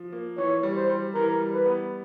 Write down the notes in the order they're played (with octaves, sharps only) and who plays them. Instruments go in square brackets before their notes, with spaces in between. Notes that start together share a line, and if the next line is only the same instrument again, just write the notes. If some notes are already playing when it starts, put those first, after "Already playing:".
Already playing: [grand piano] F3
A#3
[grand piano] E3 [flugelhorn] C#5
[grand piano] G3
[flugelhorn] C5
[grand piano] G3
[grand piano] E3 [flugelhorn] A#4
[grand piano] G3
[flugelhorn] B4
[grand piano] B3